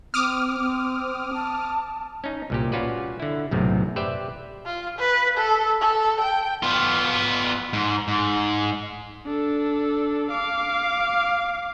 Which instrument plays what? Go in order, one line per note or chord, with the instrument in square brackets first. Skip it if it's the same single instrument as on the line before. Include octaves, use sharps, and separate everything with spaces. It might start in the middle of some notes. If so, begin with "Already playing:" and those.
[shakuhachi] C4 [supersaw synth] D6 D#6 F6
[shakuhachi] C4
A5
[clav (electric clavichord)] C#4 D#4
C2 A#2 G4
C#4 F4 F#4 B4 D5
D3 E4
B1 F#2 A2 C3
G4 B4 C5 D5 E5 G5
[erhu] F4
B4
A4
A4
G5
[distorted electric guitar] B3 F4
G#2
G#2
[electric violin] D4 A4
F5 D6